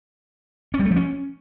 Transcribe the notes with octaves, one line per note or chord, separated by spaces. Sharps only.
C#4
G3
A3
F3
C#4